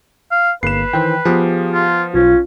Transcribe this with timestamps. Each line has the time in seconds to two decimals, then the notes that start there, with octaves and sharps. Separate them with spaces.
0.31 F5
0.63 G1 A#3 B4 C7 E7
0.93 D#3 E3 C5 G5
1.25 F3 B3 G4 G#4 F5
1.73 F4
2.14 B1 C#4 F4